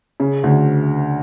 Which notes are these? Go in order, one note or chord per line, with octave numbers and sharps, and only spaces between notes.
C#3
D2